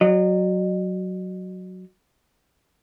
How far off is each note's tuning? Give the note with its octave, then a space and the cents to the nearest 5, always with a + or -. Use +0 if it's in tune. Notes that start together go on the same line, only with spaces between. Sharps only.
F#3 +0 D#5 -40